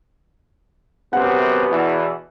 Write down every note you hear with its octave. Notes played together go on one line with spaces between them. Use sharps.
F#2 C3 B3 F#5
E2 B2 E3